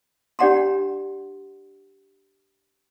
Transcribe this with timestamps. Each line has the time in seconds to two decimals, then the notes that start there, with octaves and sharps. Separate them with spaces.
0.39 D4 G4 D5 F#5 A#5 C6